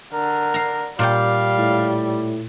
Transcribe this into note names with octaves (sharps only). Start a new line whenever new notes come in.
D3 A#4
F5 A#5
A#2 G3 D5 F5 G5
A2